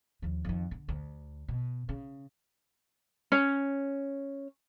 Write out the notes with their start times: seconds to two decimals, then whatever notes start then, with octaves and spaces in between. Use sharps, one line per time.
0.22 D#2 F3
0.45 F2 D#3
0.71 D3
0.89 D2
1.48 B2
1.89 C#3
3.32 C#4